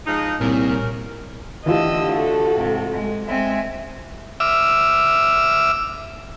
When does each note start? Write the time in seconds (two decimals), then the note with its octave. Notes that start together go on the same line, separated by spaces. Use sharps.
0.07 F3 G#3 D#4
0.41 C2 A#2 C#4 A#4
1.66 D3 E3 A3 F4 G4 D#5 E6
2.13 F#4 A4
2.57 G#2 C3
2.92 G#3
3.27 G#3 C4 E5 G#5
4.40 E5 D6 E6 F6